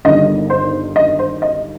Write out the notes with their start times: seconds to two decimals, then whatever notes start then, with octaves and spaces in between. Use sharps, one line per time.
0.05 G1 G2 D#3 D#5
0.50 C5
0.96 D#5
1.19 C5
1.42 D#5